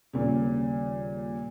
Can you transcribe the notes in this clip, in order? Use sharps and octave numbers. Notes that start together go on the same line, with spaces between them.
D#1 A#2 C#3